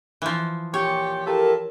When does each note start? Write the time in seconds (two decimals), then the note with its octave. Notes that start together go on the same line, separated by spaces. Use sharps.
0.22 E3 F3
0.74 A#2 G4 C#5
1.26 E4 F4 G4 A4 A#4